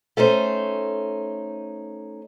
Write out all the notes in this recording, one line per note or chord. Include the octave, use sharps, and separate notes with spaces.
A3 C#4 D#4 C5